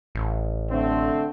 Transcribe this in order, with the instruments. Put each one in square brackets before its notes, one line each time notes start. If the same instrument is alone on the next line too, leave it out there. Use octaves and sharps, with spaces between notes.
[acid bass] A1
[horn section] D3 A3 C4